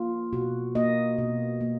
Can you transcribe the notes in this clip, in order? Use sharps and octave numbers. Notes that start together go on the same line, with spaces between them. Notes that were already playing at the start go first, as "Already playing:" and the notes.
Already playing: A#3 F4
B2 F#4
A#3 D#5
B2
A#3